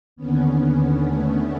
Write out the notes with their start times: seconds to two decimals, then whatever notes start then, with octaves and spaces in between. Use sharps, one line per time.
0.16 D#2 D3 B3 C#4
0.60 B3 C#4
1.04 A3 B3